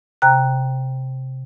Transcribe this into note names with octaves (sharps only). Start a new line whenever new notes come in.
C3 G5 A#5 F#6